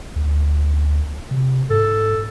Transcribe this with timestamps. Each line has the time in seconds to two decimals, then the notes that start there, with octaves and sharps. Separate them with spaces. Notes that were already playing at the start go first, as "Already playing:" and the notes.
0.16 D2
1.31 C3
1.70 G#2 A4